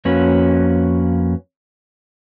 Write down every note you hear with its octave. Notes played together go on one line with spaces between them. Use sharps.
F2 A#3 C#4 F#4 B4